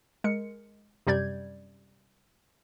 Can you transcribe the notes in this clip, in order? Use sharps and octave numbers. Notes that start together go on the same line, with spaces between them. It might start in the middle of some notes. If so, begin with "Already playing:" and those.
G#3 A#4 C#7
F#2 C3 G3 D5 G6 G#6